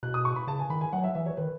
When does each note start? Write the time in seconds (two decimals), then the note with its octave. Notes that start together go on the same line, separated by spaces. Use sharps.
0.03 B2 F#6
0.14 D#6
0.25 C#6
0.36 B5
0.47 C#3 A5
0.59 G#5
0.70 D#3 B5
0.81 G#5
0.93 F#3 F#5
1.04 E5
1.15 E3 E5
1.26 C#5
1.37 D#3 B4